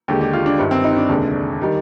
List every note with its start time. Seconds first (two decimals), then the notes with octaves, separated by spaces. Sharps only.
0.08 D#2 D3 G#3 G4
0.21 G4
0.33 F4
0.46 D4
0.59 G1 G2 D#3
0.71 C4
0.84 D#4
0.97 D4
1.09 F1 D#2 D3 G#3
1.62 D#3 G3